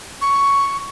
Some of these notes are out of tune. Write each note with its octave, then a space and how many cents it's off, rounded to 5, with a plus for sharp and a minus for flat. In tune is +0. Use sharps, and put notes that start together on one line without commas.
C#6 +5